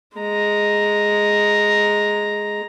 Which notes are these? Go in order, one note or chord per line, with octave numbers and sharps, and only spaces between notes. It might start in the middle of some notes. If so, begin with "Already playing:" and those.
G#3 A#5